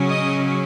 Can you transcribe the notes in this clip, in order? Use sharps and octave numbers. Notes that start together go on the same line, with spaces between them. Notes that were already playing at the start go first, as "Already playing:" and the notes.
Already playing: C#3 F#3 C#4
D#5